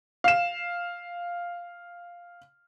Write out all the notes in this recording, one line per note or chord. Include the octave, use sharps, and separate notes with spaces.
F5 E7